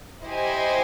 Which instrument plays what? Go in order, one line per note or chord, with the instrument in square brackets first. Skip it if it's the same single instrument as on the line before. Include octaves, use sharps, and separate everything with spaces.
[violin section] E4 G4 C5 D#5 G#5